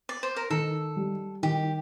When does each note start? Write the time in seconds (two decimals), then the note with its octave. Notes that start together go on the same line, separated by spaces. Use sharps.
0.09 D5
0.23 C5
0.36 A#4
0.50 D#3 A4
0.96 G3
1.43 D#3 G4